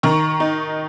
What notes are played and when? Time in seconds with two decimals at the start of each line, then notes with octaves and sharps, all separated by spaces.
0.03 D#3 A#5 C#6
0.40 D#4